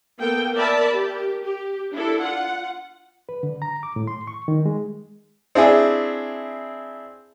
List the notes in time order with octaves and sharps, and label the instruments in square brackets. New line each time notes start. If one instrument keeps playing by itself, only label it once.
[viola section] A#3 B3 A4 G5
A#4 D5 E5 A5 B5
G4 A#4
G4
D4 E4 A4
F4 F#5
[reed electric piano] B4
D3
A#5
D6
A2
C6
C#6
D#3
G#3
[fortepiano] C4 D4 E4 G#4